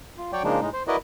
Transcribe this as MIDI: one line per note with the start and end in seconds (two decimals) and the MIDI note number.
0.18 0.31 65
0.33 0.43 54
0.33 0.43 73
0.33 0.43 74
0.33 0.43 79
0.44 0.60 49
0.44 0.60 53
0.44 0.60 56
0.44 0.60 58
0.44 0.60 62
0.44 0.60 63
0.61 0.69 45
0.61 0.69 56
0.61 0.69 63
0.73 0.83 72
0.87 0.96 64
0.87 0.96 66
0.87 0.96 70
0.87 0.96 71
0.87 0.96 74
0.87 0.96 75